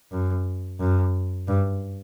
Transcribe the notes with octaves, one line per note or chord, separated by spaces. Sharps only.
F#2
F#2
G2